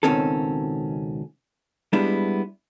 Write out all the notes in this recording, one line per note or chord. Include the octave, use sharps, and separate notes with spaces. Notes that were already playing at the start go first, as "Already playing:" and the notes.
C#2 B2 D#3 C4 C#4 A4
G3 G#3 B3 D4 E4